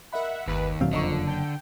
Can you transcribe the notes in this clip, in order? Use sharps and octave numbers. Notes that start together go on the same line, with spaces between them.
A#4 D#5 E5 F#5 B5
G1 D#2 B4
D2 A#2 D#3 F#3 C4 F5
F#1 F2 D3 F3 D#5 A#5 C#6
G5 A5